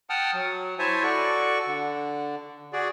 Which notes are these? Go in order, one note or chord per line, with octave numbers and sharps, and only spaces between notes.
F#5 G5 A5 D#6 F6
F#3
E4 C5 C#5 E5 G#5 A5
F#4 A4 D5 C#6
D3
F#4 G#4 D5